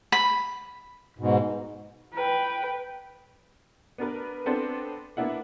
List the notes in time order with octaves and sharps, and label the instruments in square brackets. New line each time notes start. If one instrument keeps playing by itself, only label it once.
[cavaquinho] B5
[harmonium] G#2 B2
[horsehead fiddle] B4 G5
[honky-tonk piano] B3 D4 A#4 B4
B3 C4 D4 A4 C5
A#3 B3 D4 E4 F#5